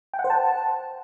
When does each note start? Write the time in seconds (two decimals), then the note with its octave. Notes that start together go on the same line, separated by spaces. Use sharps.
0.14 G5
0.19 F#5
0.24 C5
0.30 A5